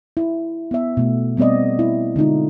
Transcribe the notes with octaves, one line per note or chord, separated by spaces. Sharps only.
E4
B3 E5
B2 A3
G3 B3 C4 D5 D#5
E4
D3 G#3 D#4 F4